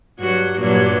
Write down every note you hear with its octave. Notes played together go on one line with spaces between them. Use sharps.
G2 F#3 F#4
G2 A#2 F#3